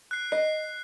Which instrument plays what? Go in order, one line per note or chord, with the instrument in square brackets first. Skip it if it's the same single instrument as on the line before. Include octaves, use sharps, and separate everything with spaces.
[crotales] F#6 C7
[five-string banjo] D#5 [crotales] C7